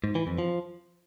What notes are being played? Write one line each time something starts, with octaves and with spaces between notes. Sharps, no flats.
G#2
E3
F2
F3